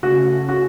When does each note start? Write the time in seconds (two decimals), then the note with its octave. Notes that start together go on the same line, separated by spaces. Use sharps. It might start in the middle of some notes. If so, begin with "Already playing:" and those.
0.03 C#3 A3 C#4 F#4
0.49 F#4